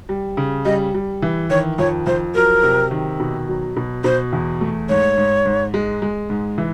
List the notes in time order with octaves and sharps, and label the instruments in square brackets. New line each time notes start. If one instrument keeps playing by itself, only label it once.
[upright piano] G3
C#3
[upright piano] G3 [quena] D#5
[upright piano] G3
E3
[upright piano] D#3 [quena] C#5
[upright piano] F2 [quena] C#5
[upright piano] F2 [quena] C5
[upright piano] F#3 [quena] A#4
[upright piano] C3
D#3
B2
F#3
B2
[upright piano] B2 [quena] C5
[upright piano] E2
A3
[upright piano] G#2 [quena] C#5
[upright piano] G#2
G#2
G#3
G#3
G#2
E3